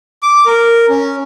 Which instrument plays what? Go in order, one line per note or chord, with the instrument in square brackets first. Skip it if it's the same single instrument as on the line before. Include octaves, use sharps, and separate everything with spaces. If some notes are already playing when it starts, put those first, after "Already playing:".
[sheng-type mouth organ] D6
A#4
C#4